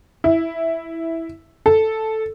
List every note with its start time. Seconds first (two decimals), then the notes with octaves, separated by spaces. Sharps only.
0.24 E4
1.66 A4